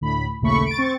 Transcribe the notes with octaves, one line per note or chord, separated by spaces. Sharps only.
D2 A2 B5
A#1 D#2 C#3 A3 B5 C#6
A6 D7
C4 C#6 A6